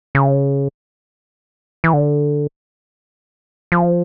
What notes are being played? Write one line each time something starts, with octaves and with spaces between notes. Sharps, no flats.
C#3
E3
D3
F3